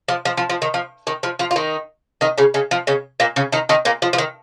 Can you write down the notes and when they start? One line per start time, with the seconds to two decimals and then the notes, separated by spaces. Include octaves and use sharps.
0.08 F3
0.25 F3
0.37 F3
0.50 F3
0.62 D#3
0.74 F3
1.07 D#3
1.23 F3
1.39 F3 F4
1.51 F4
1.56 D#3 D#4
2.21 D#3 D#4
2.38 C#3 C#4
2.54 C#3 C#4
2.71 F3
2.87 C#3 C#4
3.20 A#2 A#3
3.36 C#3 C#4
3.52 D#3 D#4
3.69 D#3 D#4
3.85 A#2 A#3
4.02 F3
4.13 F3
4.18 D#3